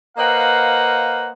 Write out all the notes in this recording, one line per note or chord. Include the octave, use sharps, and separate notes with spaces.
A#3 B4 C5 D#5 F5 F#5